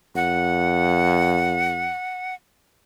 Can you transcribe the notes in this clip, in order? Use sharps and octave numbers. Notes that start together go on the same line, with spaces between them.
F2 F#5